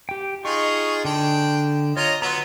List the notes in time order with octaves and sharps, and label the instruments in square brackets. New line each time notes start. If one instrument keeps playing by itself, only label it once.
[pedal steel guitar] G4 G5
[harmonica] D#4 F4 G#4 [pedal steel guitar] C#6
[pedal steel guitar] D3 [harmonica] D4 G5
[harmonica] F4 D#5 A#5 [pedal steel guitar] C#5
[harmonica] F#3 B3 [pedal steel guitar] A#5 C6